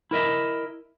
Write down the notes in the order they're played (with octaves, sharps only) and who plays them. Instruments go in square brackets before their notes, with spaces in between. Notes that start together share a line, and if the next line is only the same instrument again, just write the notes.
[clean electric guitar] E4 A#4 D#5 E5